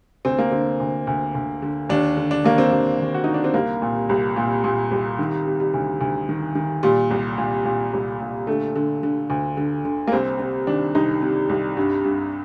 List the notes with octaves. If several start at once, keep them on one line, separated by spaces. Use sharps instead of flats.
D2 C4
A#3
D3 C4
D2
D2
D2
D3
D#2 D4
D3
D4
D#2 A#3
C4
D#2 D4
D#2
F#4
D3 D#4
D4
C4
C2 A#3
A#2
C2
A#2
A#2
C2
D#3
C3
G3
D2
D2
D#3
D#3
A#2 G3
C2
A#2
A#2
C2
A#2
D3 A3
D3
D3
D2
D3
D3
A#3
C2 C4
C3 C4
D#3 D4
C2 D#4
C3
C2
G2
G2